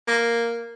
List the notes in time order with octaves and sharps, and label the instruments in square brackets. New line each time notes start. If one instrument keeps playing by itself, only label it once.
[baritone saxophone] A#3